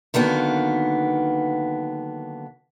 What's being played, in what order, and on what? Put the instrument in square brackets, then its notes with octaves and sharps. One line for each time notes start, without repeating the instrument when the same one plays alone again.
[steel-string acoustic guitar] D3 D#3 F#3 A#3 B3